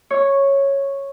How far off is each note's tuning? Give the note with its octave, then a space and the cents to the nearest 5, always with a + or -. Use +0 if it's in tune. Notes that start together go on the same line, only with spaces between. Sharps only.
C#5 -5